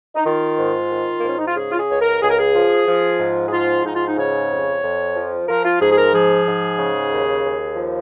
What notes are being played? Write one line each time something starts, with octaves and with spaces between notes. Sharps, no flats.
D#4
D#3 F4
G#2
D#3
G#2 A#3
C#4
D#4
F4
C#3 G#4
F4
G#4
C#2 C#5
A#4
C#2 G#4
A#4
G#4
F3
F3
G#2
G#4
F3 F4
G#2 D#4
F4
D#4
C#3 C#5
F2
F2
F3
F3 A#4
F4
G#2 G#4
G#4
A#4
F3 G#4
G#2
C#3
D#2
D#2
F3